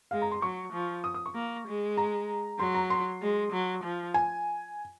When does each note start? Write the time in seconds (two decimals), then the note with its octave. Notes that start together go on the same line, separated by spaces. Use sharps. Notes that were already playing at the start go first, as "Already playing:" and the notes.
0.11 G#3 F5
0.22 A#5
0.31 C6
0.42 F#3 C#6
0.73 F3
1.04 D#6
1.14 D#6
1.26 C#6
1.35 A#3
1.67 G#3
1.97 A#5
2.59 F#3 C6
2.74 A#5
2.90 C6
3.22 G#3
3.52 F#3
3.84 F3
4.14 G#5